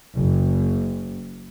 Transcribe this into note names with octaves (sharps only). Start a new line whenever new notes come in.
F#1